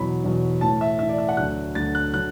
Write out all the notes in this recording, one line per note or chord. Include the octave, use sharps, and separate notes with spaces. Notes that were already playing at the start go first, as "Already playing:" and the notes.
Already playing: E2 B2 F#3 B5
E2 B2 F#3
A2 E3 A5
E5
A2 E3 E5
D5
E5
F#5
D2 D3 F#3 F#6
D2 D3 F#3 A6
F#6
D3 F#3 F#6